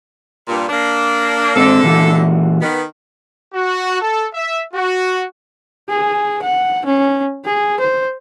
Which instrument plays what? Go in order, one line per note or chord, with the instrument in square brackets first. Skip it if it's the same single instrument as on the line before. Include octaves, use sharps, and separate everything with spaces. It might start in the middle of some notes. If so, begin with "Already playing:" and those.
[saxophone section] G2 A#2
A#3 D4
[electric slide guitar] G#2 C4 [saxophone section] D3 A4
[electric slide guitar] A#2 E3 F#4
[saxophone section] D#3 B3
[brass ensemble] F#4
A4
E5
F#4
[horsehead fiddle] G#4
F#5
C#4
G#4
C5